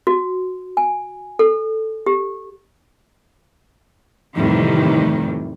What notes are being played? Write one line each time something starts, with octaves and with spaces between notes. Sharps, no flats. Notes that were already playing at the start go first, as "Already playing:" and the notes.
F#4
G#5
A4
G4
F2 A2 C3 D#3 E3 G3